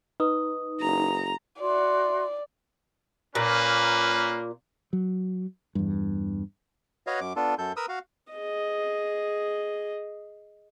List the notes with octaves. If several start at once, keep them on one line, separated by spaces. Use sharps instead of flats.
D#4 B4 D#6
F#1 A#5
F#4 D5 E5 C6
A#2 A#3 C#4 B4
F#3
E2 G2
F#4 B4 C#5 D#5 F5
F#2 D6
B3 D4 F4 A4
F#2 A4 G6
A#4 B4 D#6 E6
F#4 F5
G#4 D#5